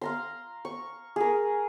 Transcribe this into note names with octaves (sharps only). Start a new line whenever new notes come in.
F5 A#5 C6
C#6
G#4 A#4